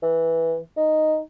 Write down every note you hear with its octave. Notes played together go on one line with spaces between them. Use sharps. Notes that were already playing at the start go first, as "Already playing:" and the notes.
E3
D#4